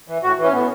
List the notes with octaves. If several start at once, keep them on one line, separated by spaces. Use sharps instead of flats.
E3
A2 F#4
E3
C#4
A2 B3